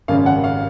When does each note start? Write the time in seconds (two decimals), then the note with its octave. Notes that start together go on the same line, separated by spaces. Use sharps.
0.08 G#1 F#2 C#3 F5
0.26 F#5
0.44 F5